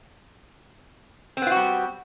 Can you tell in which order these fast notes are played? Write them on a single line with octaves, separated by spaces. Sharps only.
C4 B3 F4 F#4 G3